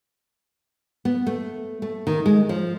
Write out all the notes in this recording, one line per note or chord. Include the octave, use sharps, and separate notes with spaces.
B3
A3
A3
D#3
G#3
F3